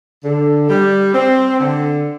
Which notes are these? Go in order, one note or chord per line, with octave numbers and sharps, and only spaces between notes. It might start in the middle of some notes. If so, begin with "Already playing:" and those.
D3
G3
C4
D3